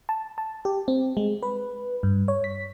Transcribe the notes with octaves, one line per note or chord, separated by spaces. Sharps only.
A5
A5
G4
C4
G#3
B4
G2
C#5
B6